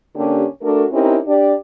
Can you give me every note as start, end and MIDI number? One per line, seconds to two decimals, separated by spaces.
0.15 0.44 50
0.15 0.44 58
0.15 0.44 61
0.15 0.44 62
0.15 0.44 67
0.62 0.84 57
0.62 0.84 62
0.62 0.84 66
0.62 0.84 69
0.62 0.84 70
0.91 1.18 60
0.91 1.18 61
0.91 1.18 63
0.91 1.18 64
0.91 1.18 67
0.91 1.18 70
1.26 1.54 62
1.26 1.54 67
1.26 1.54 74